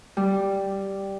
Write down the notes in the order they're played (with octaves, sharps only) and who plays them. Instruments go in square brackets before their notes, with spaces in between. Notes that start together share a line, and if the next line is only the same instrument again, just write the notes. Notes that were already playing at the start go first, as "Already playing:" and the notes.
[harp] G3